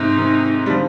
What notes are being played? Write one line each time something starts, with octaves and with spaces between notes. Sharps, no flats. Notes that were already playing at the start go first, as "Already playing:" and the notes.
Already playing: G#2 C3 D#4
C3 D#3
G3
D3 F3